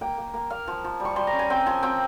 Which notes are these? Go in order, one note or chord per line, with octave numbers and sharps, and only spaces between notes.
A#3 G5
A#3
A#3
A#3 F5
F3
F3
G3
C#6
G3 C6
A#5
C#4
G#5
C4 G5
F3 G#5
C4 G5